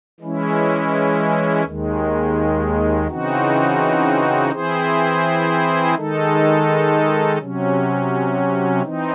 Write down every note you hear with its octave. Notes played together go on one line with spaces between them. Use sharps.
E3 G#3 C#4 E4
D#2 D#3 G#3
C#3 E3 C4 D#4 F#4
E3 C4 E4 G#4 C5
D#3 G#3 D#4 A4
C3 F#3 C#4
E3 C4 D#4